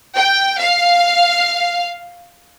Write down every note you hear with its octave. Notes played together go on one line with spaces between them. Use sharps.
G5
F5